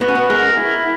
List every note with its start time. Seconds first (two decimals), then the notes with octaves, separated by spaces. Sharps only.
0.01 B3 F#4
0.08 C#4
0.15 B3
0.30 G#3 A#4
0.57 E4